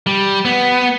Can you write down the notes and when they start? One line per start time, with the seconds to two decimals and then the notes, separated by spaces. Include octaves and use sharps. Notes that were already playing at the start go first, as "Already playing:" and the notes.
0.07 G3
0.45 B3